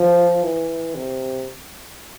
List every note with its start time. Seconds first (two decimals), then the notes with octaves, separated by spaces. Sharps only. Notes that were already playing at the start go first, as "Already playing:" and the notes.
Already playing: F3
0.43 E3
0.95 C3